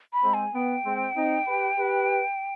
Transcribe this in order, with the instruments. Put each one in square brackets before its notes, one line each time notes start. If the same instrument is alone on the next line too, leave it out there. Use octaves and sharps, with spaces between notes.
[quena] B5
[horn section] G#3 C4
[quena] G#5
[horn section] B3 [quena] G5
[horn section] G#3 C4
C4 D#4
G4 B4
G4 B4